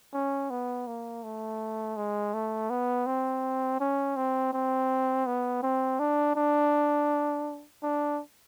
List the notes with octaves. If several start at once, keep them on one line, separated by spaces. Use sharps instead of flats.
C#4
B3
A#3
A3
G#3
A3
B3
C4
C#4
C4
C4
B3
C4
D4
D4
D4